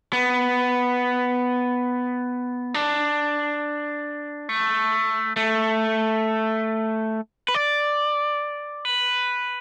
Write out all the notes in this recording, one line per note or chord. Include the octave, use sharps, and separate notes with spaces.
B3
D4
A3
A3
B4
D5
B4